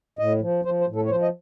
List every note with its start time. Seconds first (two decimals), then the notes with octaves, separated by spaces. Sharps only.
0.19 A2 D#5
0.41 F3
0.65 F3 C5
0.81 C5
0.88 A2
0.96 A4
1.05 C#5
1.10 F3 C5
1.22 D#5